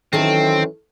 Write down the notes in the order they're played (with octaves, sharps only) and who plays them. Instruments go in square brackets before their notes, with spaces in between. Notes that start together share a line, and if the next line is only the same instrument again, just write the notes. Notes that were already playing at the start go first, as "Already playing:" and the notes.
[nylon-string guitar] D#3 A4 E5 [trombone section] E3 F#3 C#4 [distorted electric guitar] C4